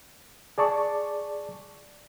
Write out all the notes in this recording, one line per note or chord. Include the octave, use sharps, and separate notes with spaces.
G#4 D5 A5 C#6